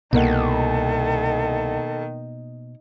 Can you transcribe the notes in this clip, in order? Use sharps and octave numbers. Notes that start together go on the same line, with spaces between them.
C2 B2 D#3 A#3 A4 F#5